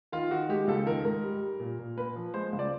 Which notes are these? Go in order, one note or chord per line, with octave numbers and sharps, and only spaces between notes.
D#3 F4
D#3 F#4
G#3 G4
C#2 A4
D#3 A#4
G#2 A#4
G3
G3
A#2
A#2
A#3 B4
F3
G#3 C5
C#2
D5